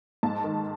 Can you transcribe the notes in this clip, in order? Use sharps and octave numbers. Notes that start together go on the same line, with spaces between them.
G#2 A5
D#3